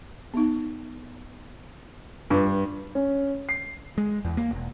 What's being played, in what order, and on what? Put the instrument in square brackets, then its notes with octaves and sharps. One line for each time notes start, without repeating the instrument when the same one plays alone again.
[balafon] B3 D#4
[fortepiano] G2 [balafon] F4 B4
[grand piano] C#4
C7
[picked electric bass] G#3
E2
A#3
E1